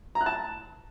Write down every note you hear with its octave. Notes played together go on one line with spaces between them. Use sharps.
A#5
F#6
A5